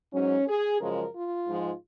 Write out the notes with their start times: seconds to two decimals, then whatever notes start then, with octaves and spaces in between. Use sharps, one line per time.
0.13 G#2 F#3 C#4
0.48 G#4
0.80 F#2 C#3 F3 G#3 A#4
1.14 F4
1.48 G#2 F3 G#3